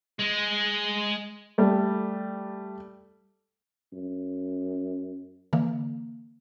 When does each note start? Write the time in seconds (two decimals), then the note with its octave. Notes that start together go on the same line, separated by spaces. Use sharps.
0.19 G#3
1.58 G3 A3
3.92 F#2
5.53 D3 E3 A#3